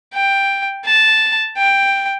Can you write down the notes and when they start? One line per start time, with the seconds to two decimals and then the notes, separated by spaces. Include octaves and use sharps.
0.14 G5
0.86 A5
1.58 G5